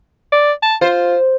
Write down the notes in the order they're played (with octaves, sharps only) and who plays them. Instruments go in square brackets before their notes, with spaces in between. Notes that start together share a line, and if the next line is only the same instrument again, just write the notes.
[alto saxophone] D5
A5
[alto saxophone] F4 [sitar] C5